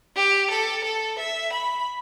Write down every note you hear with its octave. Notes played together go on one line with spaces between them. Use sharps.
G4
A4
A4
E5
B5